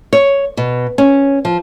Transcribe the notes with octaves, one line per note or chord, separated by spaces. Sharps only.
C#5
B2
C#4
F3